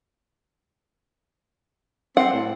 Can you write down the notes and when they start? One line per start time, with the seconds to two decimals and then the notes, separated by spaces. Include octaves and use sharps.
2.17 C4 F#5
2.33 A2